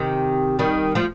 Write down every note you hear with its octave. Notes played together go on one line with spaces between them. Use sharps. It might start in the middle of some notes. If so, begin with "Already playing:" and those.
Already playing: C3 D#3
D#3 G3
F3 A3